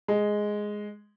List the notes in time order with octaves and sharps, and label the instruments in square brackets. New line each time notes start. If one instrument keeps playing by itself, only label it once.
[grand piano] G#3